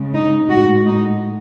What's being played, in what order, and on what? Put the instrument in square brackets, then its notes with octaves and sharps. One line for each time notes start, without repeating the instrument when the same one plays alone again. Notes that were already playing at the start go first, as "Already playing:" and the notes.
Already playing: [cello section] C#3 G#3
D#4
A2 G#3 F#4
D#4